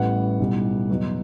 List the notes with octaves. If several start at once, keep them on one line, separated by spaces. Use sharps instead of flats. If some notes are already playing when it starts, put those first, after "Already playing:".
Already playing: A1 A2 G3 B3 F#5
B1 A2 G3 B3
E2 B2 F#3 B3